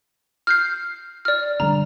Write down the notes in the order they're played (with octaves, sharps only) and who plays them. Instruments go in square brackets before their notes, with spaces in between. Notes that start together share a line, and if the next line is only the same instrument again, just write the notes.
[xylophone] F6 G6 C7
D5 F6
[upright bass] D3 G3 [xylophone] A#5